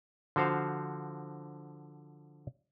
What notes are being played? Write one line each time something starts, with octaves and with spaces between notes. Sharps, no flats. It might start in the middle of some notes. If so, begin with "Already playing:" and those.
D3 F3 F#4 C5 F5